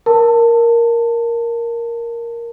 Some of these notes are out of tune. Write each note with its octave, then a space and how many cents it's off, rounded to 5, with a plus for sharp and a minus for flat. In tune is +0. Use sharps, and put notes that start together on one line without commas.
A#4 +0 A5 +20